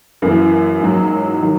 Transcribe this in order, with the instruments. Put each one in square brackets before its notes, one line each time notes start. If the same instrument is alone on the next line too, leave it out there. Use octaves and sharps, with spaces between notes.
[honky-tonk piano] F#2 E3 A#3
G#2 F#3
D#3 F#3